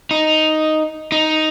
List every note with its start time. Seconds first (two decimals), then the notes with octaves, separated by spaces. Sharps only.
0.11 D#4
1.12 D#4